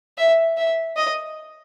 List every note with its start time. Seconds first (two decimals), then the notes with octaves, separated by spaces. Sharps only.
0.18 E5
0.57 E5
0.97 D#5